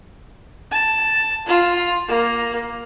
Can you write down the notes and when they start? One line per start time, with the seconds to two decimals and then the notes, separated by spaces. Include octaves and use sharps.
0.71 A5
1.47 F4
2.08 A#3